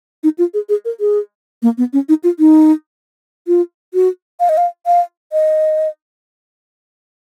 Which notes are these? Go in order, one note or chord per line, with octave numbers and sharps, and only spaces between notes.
D#4
F4
G#4
G#4
A#4
G#4
A#3
B3
C#4
D#4
F4
D#4
F4
F#4
F5
D#5
F5
F5
D#5